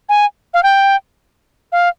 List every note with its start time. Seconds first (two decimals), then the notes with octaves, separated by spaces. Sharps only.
0.09 G#5
0.54 F5
0.63 G5
1.72 F5